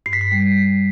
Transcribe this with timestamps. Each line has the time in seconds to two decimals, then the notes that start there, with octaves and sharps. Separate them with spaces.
0.06 G2 C7
0.13 B6
0.21 C7
0.32 G3
0.57 G2